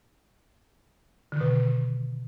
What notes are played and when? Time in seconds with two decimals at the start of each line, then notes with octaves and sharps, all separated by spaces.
1.32 D3
1.36 D#3
1.41 B2